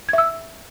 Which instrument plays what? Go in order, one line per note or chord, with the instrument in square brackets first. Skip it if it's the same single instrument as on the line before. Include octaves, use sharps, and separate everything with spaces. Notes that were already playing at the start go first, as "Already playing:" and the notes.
[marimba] G#6
E5
E6